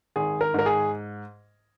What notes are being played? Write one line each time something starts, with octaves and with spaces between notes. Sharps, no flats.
G#1 G#4
A#4
G#2 A#4
G#4